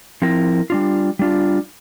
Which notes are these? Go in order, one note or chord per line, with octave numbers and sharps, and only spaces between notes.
F3 C4 E4 A#4
G3 D4 F4
G3 D4 F4